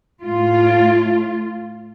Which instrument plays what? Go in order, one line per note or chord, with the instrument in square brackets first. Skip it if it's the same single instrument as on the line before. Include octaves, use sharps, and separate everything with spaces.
[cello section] A2 F4